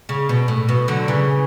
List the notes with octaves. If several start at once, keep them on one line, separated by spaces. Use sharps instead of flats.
C#3
B2
A2
B2
D3 F#3
C#3 E3